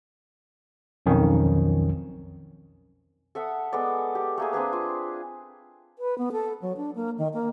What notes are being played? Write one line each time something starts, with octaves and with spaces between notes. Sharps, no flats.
B1 F2 D#3 C#4
A4 E5 F#5 D#6
G#3 B3 A4 D5
G4
A3 A#3 G#4
C4 D4 G#4 B4
F4
B4
B3
A4
F#3
D4
A#3
D#3
A#3